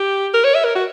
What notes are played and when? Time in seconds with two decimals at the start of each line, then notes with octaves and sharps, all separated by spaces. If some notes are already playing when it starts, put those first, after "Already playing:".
Already playing: G4
0.34 A#4
0.44 C#5
0.54 E5
0.65 A#4
0.75 F#4